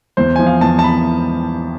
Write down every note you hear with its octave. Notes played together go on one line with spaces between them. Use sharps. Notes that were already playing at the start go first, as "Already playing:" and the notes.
E2 C5
F3 G#5
F5
E2 A5
A5
B5